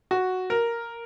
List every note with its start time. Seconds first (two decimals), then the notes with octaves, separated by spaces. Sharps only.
0.11 F#4
0.50 A#4